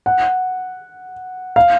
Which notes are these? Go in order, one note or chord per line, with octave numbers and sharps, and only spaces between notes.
F#5
F5